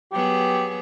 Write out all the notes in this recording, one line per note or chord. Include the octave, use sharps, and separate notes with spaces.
F#3 B3 G4 G#4